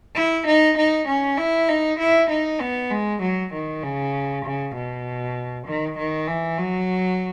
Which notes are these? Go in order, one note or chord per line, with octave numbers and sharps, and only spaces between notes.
E4
D#4
D#4
C#4
E4
D#4
E4
D#4
B3
G#3
F#3
D#3
C#3
C#3
B2
D#3
D#3
E3
F#3